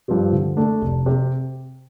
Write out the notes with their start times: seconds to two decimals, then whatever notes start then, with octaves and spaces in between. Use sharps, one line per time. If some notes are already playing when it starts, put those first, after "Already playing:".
0.08 G2 F3 C4 G4
0.33 D3
0.57 A3 D4 A4
0.81 F1
1.06 C3